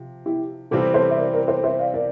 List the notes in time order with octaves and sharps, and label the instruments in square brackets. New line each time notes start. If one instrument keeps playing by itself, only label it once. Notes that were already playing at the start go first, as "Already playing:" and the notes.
Already playing: [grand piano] C3 F3
[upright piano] E4 G4
[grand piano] C3 E3 G3 C4 [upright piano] F4 A4
[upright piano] A4 C5
E5
A#4 D5
A#4 D5
A4 C5
C5 E5
D5 F5
A#4 D5